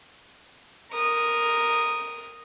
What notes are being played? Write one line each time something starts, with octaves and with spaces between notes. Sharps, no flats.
A#4 D#6